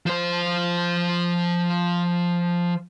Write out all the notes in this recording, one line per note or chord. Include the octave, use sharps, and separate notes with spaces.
F3 C5